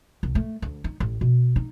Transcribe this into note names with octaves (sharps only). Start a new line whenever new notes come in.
C2
A3
D2
D#4
A1
B2
D#4